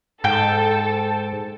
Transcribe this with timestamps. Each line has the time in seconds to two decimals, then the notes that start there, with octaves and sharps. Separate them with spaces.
0.24 G#2 A4 G5 G6